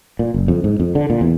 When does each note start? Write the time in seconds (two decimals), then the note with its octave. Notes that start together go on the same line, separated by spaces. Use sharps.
0.19 A#2
0.34 F#1
0.48 F2
0.64 G#2
0.80 F2
0.95 D3
1.10 A#2
1.21 E2